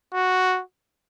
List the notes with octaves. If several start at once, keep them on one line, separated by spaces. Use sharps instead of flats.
F#4